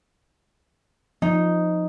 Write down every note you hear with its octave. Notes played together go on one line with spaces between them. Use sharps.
F3 D#4